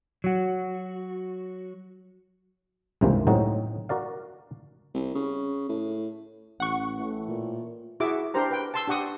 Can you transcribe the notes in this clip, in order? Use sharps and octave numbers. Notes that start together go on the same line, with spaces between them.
F#3 F#4
C#2 G2 C3 E3 A#3 C5
A2 F#3 C4 D#4 F#4
F#4 A#4 D5 F5
C2
C#3
A2
A1 F#5 C#6
A2 E3 A3
A#2
E4 F#4 G#4 E5 D6
D4 G4 A#4 C5 A#5
B4 G5
A5 C6 E6
D4 G4 F#5 C#6 D#6